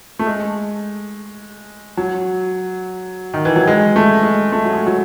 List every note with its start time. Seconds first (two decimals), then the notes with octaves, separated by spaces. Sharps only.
0.19 A3
0.27 G#3
1.97 F#3
3.34 D#3
3.45 E3
3.56 F#3
3.68 G#3
3.96 A3
4.23 G#3
4.52 A3
4.65 F#3
4.73 G#3
4.86 F#3